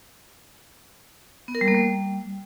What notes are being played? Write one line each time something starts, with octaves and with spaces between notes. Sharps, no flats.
B3
A#4
G3
A#3
G3